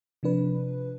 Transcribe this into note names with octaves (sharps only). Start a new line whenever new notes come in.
C3 F3 D4 B4